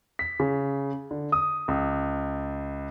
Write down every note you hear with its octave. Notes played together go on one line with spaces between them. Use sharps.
B6
C#3
D3
D#6
C#2